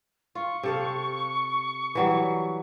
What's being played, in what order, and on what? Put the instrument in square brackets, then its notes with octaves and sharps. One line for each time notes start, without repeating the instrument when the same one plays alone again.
[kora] F4 [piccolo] C#6
[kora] C3 A4 F5
E3 F#3 G3